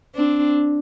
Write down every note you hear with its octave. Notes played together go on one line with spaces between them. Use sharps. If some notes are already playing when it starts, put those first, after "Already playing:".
C4 D4